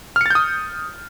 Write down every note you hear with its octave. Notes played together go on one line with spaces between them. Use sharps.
D#6 F6 G6 A6 C#7